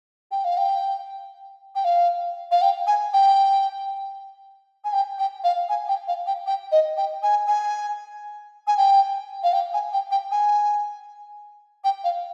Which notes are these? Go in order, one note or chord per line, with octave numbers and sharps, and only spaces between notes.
G5
F5
G5
G5
F5
F5
G5
G#5
G5
G#5
G5
G5
F5
G#5
G5
F5
G5
G5
D#5
G5
G#5
G#5
G#5
G5
F5
G5
G#5
G5
G5
G#5
G5
F5